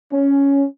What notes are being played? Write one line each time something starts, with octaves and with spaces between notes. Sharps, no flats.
C#4